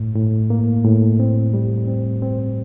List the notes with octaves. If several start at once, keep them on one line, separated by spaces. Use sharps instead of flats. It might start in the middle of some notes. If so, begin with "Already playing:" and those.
Already playing: A2
A2
A#3
A2
C4
G3
C4
C4